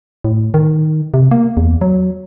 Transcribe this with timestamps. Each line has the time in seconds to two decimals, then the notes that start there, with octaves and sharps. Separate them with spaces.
0.24 A2
0.54 D#3
1.14 C3
1.31 A#3
1.57 E2
1.81 F#3